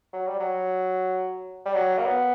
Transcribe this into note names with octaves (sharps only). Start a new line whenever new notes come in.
F#3
G3
F#3
G3
F#3
A#3
B3